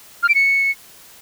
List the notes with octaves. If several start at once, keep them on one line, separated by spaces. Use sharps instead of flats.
F6
D7
C#7